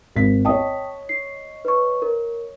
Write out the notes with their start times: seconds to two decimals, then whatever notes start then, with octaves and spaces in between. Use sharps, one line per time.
0.16 G#1 B6
0.45 C#5 D#5 G5 A5 D#6
1.09 C7
1.65 B4 C#6
2.02 A#4